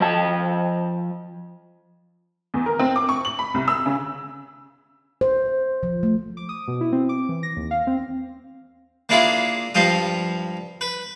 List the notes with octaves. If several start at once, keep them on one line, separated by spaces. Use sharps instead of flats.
F3 D#5 A5
E2
A#4
C4
D6
C#6
F#7
B5
C2
E6
C#3
C5
F3
A3
D6
D#6
B2
E4
C4
D6
E3
A#6
D#2
F5
C4
A#3 D4 E4 F4 G#4
G2 F3 F4 D#6
B4